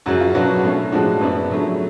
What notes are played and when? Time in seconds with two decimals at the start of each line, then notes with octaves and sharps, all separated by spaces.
0.06 F#2 C#3 F#3 C#4 F#4
0.20 F4
0.35 B2 F#3 B3 D4 F#4
0.63 B2 A3 C#4
0.92 A2 F3 G#3 D4 F#4
1.21 F#2 F3 B3 D4
1.50 C#3 F#3 A3